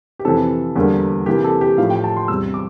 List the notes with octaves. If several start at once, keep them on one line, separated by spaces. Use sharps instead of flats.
G4
F2 C3 E3 A4
E2 D3 G3 A#3
C3 E3 A#3 G4
A4
G4
A2 F3 A3 F5
G5
A5
C6
E2 C3 G3 E6
D6